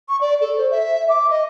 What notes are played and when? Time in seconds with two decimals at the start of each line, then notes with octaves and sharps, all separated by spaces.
0.09 C#6
0.21 D5
0.41 A4
0.57 C5
0.71 E5
1.09 D6
1.31 D#5